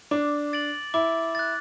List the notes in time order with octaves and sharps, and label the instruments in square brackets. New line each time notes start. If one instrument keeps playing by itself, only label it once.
[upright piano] D4 [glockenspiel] D6
[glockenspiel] A6 D7 F#7
[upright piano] E4 [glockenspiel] D6
[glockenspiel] F#6 A6